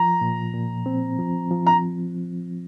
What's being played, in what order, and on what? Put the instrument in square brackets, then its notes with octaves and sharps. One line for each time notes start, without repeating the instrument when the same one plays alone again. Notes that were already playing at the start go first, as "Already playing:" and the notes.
Already playing: [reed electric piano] F3 [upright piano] A#5
[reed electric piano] A#2
A#2
C4
F3
F3
[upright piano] A#5